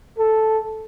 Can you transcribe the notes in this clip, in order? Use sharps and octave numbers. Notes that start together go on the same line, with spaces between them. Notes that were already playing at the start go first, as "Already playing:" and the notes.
A4